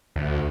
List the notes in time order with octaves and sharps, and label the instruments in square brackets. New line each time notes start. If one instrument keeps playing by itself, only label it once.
[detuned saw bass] D2